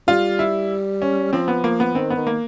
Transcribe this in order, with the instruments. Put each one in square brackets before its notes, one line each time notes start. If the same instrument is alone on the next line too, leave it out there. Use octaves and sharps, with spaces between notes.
[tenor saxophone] G3 [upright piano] F4
[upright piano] E4
C#4
[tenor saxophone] F3 [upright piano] C4
[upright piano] B3
[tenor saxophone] F3 [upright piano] A#3
[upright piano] B3
[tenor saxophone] D#3 [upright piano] C4
[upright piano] B3
[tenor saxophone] D#3
[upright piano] A#3